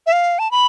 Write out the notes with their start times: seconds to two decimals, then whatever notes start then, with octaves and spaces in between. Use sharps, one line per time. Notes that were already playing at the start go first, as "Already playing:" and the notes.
0.07 E5
0.12 F5
0.39 A5
0.51 B5